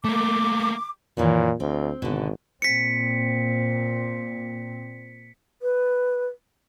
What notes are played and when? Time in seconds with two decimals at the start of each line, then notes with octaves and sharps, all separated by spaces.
0.05 A3 A#3 D6
1.17 F#2 A#2 D#3 E3
1.60 D2 C4
2.02 G#1 B2 D3
2.62 A#2 C4 B6 C#7
5.62 B4